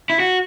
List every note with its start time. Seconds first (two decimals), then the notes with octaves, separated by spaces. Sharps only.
0.10 E4
0.20 F#4